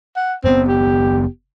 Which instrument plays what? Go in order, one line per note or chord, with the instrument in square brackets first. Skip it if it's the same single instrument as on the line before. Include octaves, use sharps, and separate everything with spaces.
[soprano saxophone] F#5
[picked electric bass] F#1 B3 [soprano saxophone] C4
[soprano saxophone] G4